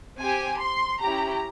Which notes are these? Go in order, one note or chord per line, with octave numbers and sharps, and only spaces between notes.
C4 G4 G#5
C6
C#4 E4 G4 A#5